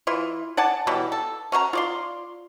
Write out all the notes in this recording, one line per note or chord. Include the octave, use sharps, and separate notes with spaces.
E3 E4 F4
D5 F#5 G#5 A5
B2 E3 F#3 G3
A4
C#4 F#4 A#4 A#5
F4 D5 C6